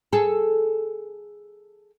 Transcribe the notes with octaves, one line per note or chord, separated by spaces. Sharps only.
G#4 A4